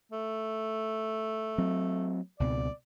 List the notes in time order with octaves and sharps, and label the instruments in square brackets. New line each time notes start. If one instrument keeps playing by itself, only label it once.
[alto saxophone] A3
[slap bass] F#3 C4
[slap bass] C#2 B2 C4 [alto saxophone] D5